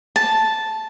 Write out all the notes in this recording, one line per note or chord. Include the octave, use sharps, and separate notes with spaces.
A5